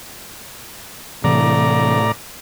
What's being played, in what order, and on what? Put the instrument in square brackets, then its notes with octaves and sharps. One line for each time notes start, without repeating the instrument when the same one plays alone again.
[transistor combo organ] A2 D5 A#5 [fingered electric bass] C3 E3